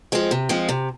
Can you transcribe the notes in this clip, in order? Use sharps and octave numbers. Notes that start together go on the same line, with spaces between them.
F3 G#3 C4
C3
F3 G#3 C4
C3